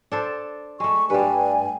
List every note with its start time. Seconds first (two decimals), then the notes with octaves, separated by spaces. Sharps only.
0.12 D4 A4 C5
0.80 G#3 A3 C#6
1.10 G2 G3 B4 G#5